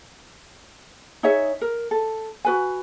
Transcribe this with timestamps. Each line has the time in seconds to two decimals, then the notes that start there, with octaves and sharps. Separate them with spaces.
1.23 D#4 G#4 C#5 E5
1.61 A#4
1.91 A4
2.45 F#4 B4 G#5